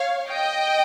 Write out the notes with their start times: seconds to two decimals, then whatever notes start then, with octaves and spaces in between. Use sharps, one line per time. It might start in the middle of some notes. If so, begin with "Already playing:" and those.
Already playing: C#5 F5
0.28 D#5 G5